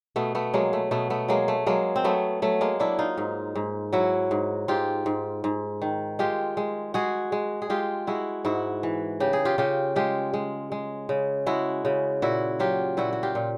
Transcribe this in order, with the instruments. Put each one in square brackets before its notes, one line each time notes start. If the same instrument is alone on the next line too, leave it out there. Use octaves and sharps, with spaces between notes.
[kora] B2 A3 B3
A3 B3
F#3 G#3 A#3
A3
B2 A3 B3
A3 B3
F#3 G#3 A#3
A3
F#3 G#3 A#3
C4
F#3 A3 B3
F#3 A3
G#3 A#3
F#3 D4 E4
D#4 F4
G#2
G#2
F#3 E4 F#4
G#2
G#2 F4 G4
G#2
G#2
D#3
G#3 F4 G4
G#3
G#3 F#4 G#4
G#3
G#4
G#3 F4 G4
G#3 E4 F#4
G#2 E4 F#4
E3
C#3 G4
G#4
F4 G4
C#3 F4 G4
G#3 F4 G4
G#3
G#3
C#3
G#3 E4 F#4
C#3
A#2 E4 F#4
F#3 F4 G4
A#2 E4 F#4
F#4
F4 G4
A#2